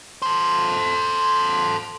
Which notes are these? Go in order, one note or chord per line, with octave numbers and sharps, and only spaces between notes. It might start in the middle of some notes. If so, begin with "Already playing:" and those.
A4 C5